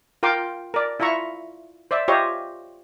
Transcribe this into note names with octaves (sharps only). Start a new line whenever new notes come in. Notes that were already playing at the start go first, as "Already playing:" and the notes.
F4 A#4 G5 C6 D6
A#4 D5
E4 F4 E5 A#5 C#6
C5 D5 E5
F4 G4 C5 C#5 D#5 E5